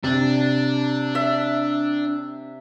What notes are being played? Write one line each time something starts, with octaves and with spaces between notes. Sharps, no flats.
C3 D4
E5